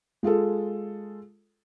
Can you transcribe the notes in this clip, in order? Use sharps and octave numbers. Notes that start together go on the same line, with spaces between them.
G#3 F4 G#4 A4